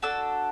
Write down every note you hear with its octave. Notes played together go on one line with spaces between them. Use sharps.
D4 F#4 A4 E6